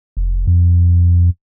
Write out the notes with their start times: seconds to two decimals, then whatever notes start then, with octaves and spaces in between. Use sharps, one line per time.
0.17 F1
0.47 F2